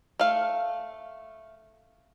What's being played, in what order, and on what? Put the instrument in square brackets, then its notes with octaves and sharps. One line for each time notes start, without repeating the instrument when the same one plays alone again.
[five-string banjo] A3 F5